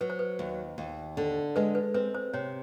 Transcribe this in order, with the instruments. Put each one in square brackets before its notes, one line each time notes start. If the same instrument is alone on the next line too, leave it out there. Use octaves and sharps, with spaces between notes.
[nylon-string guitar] F#3 [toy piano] B4
[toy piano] C5
B4
[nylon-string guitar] D#2
D#2
D3
[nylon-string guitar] G#3 [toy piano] B4
[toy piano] B4
[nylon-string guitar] C4 [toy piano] B4
[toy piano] C5
[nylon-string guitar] C3 [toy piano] C#5